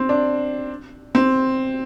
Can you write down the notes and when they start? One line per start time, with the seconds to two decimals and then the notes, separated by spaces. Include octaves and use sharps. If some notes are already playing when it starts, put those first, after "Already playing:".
Already playing: C4
0.09 D4
1.15 C4